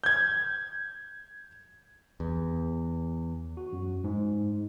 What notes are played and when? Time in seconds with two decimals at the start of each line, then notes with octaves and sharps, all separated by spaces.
0.04 G6 G#6
2.20 E2
3.57 F#4
3.73 F#2
4.04 G#2